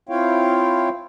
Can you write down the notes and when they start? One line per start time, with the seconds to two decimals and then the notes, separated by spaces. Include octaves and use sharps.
0.09 C4 E4 F4 C#5 F5 G5